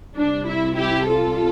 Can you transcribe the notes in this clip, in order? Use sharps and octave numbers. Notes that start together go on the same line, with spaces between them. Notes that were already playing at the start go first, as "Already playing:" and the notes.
C2 C3 G3 D4
E4
E4 G4
F4 A4